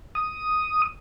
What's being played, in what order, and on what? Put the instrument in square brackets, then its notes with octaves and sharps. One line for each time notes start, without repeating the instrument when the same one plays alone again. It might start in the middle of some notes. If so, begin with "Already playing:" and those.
[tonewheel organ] D#6